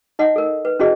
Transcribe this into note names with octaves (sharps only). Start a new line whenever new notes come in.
D#4 D#5 F#5
A4 A#4
B4
C#4 E4 F#4 G#4 D#5